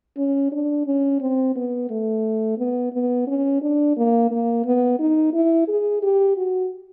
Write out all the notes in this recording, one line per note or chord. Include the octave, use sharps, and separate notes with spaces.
C#4
D4
C#4
C4
B3
A3
B3
B3
C#4
D4
A#3
A#3
B3
D#4
E4
G#4
G4
F#4